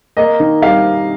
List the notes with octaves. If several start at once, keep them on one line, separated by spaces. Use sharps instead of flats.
A#3 D#5
D#3
G3 F5